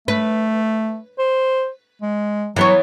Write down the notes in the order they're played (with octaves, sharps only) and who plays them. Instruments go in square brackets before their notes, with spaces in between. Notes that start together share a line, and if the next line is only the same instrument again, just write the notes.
[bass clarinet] A3 [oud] B4
[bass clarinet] C5
G#3
[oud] E3 B3 C#5 [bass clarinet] F#3